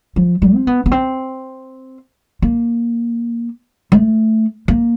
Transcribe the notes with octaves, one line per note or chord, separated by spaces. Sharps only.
F3
F#3
C4
B3
B3
C4
A#3
A3
A#3